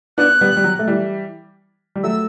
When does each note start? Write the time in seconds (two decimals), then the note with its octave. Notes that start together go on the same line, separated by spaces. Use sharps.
0.18 B3 D4 F#6
0.41 G3 B3
0.57 G3
0.64 F#3
0.79 A3
0.88 E3 G3
1.96 G3
2.03 F#3 A3 E6